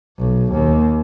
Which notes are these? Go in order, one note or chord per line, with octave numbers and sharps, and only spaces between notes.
B1
D#2